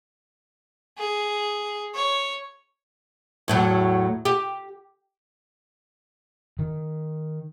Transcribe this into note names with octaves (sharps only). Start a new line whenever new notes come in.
G#4
C#5
E2 A2 F#3
G4
D#3